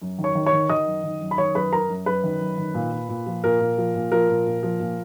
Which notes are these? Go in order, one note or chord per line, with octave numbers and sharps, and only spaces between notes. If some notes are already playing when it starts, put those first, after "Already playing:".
F#2
D#3
C#5 C#6
D#3
C#5 C#6
D#3
D#3 D#5 D#6
F#2
D#3
F#2
B5
D#3 C#5 C#6
F#2 B4 B5
F#2 A#4 A#5
F#2
F#2 B4
D#3
F#2
D#3
A#2
A#2
A#2
F3
A#2 A#4
A#2
F3
A#2
F3 A#4
A#2
A#2
F3
A#2